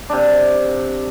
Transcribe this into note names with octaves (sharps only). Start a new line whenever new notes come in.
C3 D4